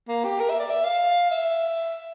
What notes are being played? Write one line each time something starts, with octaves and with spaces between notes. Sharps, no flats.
A#3
G4
A#4
E5
D5
E5
F5
E5